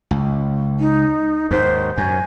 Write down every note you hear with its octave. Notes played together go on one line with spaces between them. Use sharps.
C#2
D#4
D#2 G#2 C5
F#2 G#5